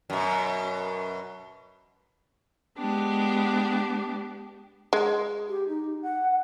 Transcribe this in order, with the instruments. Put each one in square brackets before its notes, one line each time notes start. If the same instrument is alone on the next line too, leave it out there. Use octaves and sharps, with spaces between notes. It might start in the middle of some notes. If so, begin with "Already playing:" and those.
[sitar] F#2 B2
[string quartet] G#3 B3 D4 G4
[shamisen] G#3
[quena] G4
D#4
F#5